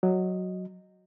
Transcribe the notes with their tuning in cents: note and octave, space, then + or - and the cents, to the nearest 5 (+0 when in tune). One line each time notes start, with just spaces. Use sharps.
F#3 +0 D#5 +0